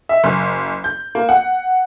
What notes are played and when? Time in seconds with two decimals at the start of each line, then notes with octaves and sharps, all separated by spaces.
0.09 E5
0.24 F#1
0.84 G6
1.15 A#3
1.29 F#5